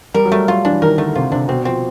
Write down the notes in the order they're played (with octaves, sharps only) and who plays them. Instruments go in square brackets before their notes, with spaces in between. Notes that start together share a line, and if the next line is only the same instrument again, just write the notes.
[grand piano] G3 [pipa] A#4
[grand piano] F#3
[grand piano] G3 [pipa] A3
[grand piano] F#3 [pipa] F4
[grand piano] E3 [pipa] D4
[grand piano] D#3 [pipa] A#4
[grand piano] D3 [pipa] A3
[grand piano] C3 [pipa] F4
[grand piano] C3 [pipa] D4
[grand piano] B2 [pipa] C4
[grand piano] F3 [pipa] C4